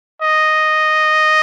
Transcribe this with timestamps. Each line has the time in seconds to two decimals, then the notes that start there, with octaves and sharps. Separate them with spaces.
0.22 D#5